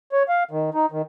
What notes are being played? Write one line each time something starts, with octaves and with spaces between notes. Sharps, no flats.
C#5
F5
D#3
D#4
D#3